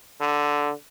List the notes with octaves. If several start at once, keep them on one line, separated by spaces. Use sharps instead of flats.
D3